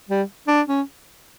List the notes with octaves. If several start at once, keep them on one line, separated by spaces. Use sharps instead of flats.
G3
D4
C#4